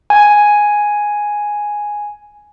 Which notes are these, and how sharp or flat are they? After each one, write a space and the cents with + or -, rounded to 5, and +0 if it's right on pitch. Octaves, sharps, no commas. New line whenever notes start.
G#5 +0